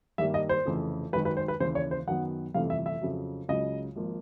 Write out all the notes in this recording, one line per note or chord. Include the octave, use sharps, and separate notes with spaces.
G2 D#3 G3 A#3 E5
D#5
C5
F1 F2 C#3 E3
G#1 F#2 D#3 B4
B4
C5
B4
D#2 C#3 E3 C5
C#5
C5
F#2 D#3 F#3 B3 F#5
G1 F2 C3 E3 A3 F5
E5
E5
F2 C#3 F#3
C#2 C#3 F#3 D#5
G#1 F3 A#3